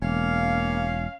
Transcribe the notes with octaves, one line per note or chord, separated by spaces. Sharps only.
E1 A#3 C#4 F5